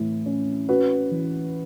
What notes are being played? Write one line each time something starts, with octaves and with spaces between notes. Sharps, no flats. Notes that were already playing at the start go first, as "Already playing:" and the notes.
Already playing: A2 E3 E4
C#4
C#4 F#4 B4
E3